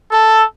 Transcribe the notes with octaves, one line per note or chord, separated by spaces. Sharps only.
A4